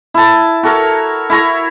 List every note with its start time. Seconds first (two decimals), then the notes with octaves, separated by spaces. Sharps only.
0.14 E4 A5
0.63 F#4 A4 A#4 C#5
1.30 E4 C#5 A#5 C#6